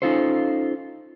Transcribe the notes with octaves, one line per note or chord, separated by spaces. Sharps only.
C#4 D#4 F4 A4 C5